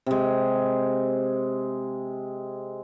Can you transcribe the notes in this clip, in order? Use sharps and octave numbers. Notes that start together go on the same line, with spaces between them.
C3 G#3